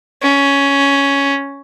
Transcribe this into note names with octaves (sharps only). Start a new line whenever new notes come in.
C#4